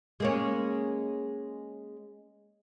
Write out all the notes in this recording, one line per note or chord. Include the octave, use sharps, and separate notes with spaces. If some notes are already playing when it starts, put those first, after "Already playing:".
G#3 A#3 C#4